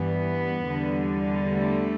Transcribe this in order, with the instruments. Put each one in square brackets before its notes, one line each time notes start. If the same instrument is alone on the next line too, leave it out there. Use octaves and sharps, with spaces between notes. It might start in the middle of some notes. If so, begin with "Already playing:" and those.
Already playing: [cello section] G2 E3 G3 B3
E2 D3 G3
A3